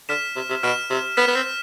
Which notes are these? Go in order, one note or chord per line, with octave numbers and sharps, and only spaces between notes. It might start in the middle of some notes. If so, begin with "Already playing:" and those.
D3 F6 B6 E7
C3
C3
B2 F6 B6 E7
C3
B3 F6 B6 E7
B3
C4